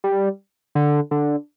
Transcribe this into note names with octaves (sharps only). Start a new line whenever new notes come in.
G3
D3
D3